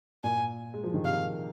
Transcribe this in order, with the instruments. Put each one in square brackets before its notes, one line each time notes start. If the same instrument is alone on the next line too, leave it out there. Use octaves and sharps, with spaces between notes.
[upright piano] A#2 [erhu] G#5
[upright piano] G#3
F3
D#3
[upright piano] C3 [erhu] F5